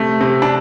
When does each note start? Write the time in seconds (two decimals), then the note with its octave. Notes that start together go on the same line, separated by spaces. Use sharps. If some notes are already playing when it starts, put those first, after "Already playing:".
Already playing: C3 A3
0.21 C3
0.42 D4